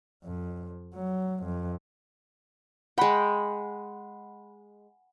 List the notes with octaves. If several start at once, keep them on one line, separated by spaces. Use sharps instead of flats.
F2
F#3
F2
G#3 F#5 G5 B5